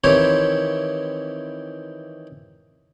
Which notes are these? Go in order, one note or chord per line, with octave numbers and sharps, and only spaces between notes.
D#3 E3 C4 E4 G4 C#5